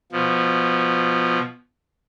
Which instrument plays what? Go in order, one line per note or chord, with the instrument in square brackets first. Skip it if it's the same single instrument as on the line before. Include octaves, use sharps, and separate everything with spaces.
[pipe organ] B2 F3